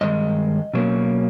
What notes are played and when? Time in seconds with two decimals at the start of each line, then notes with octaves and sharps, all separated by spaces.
0.01 G2 D#3 G#3 D#5
0.73 B2 F#3 A#3 C#4